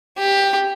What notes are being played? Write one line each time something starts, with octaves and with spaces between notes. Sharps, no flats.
G4